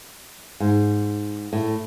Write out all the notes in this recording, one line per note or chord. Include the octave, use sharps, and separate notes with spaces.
G#2
A2